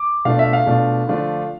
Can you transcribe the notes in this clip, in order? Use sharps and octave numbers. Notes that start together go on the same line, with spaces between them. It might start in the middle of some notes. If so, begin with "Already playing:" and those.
Already playing: D6
B2 A3 D4 F4 F5
E5
F5
B2 A3 D4 F4
D3 F3 A3 D4 F4